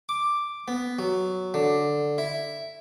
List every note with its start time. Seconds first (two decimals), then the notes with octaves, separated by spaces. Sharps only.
0.09 D6
0.68 B3
0.99 F#3
1.54 D3
2.18 E4